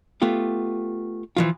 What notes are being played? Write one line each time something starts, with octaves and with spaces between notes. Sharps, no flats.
A3 B3 F4 G4
E3 F3 F4